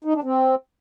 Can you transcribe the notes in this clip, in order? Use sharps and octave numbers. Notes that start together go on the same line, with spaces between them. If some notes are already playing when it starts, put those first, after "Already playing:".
D#4
D4
C4